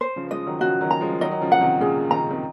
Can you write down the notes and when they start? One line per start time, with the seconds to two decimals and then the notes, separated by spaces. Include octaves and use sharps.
0.01 C5
0.16 C#3 F3
0.31 F3 G#3 D#5
0.46 D#3 F#3
0.61 C#3 F3 F#4
0.81 D#3 F#3
0.91 A#5
1.01 F3 G#3
1.12 F3
1.21 D#3 F#3 D#5
1.31 F#3
1.41 C#3 F3
1.52 F#5
1.61 C3 D#3
1.80 A#2 C#3 G#4
2.10 D#3 A#5
2.20 C#3
2.31 C3 D#3